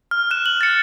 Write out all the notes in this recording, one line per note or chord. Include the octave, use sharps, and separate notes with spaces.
F6
F#6 E7
F#7
A6 C#7